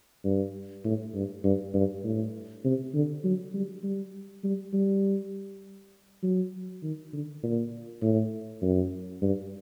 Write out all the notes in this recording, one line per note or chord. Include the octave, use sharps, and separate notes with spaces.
G2
A2
G2
G2
G2
A2
C3
D3
F#3
G3
G3
G3
G3
F#3
D#3
D3
A#2
A2
F#2
G2